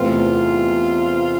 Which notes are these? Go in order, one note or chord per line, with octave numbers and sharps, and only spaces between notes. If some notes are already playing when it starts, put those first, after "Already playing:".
Already playing: E2 C3 E3 A3 C4 F4